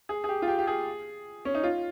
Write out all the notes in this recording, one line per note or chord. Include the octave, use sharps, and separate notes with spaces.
G#4
G#4
G4
F4
G4
G4
G#4
C#4
D#4
F4